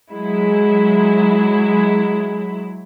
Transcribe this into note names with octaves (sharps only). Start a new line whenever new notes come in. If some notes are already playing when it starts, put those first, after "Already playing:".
F#3 G#3 E4